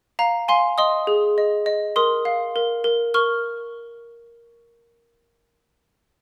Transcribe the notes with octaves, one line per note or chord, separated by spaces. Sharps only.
F5 A#5
F5 G#5 C6
D#5 C6 D#6
G#4
D#5
D#5
A#4 C6 D#6
F5
A#4
A#4
A#4 C#6 F6